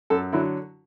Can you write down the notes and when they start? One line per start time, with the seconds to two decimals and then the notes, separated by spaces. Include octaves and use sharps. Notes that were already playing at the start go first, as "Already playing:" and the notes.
0.10 F#2 A4
0.33 D3 F#3 E4